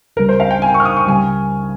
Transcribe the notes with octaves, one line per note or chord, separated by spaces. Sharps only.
C#2 C#3 G3 A#4
C5
F5
G5
G#5
C#6
F6
D#6
C#6
C#2 C#3 G3 G#5